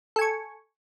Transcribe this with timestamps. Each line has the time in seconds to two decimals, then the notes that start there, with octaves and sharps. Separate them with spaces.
0.16 A4
0.19 G#5
0.21 C#6